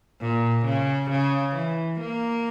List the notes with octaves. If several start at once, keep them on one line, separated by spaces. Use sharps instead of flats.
A#2
C#3
C#3
E3
A#3